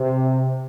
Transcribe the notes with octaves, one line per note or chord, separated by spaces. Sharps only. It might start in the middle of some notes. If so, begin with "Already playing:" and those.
Already playing: C3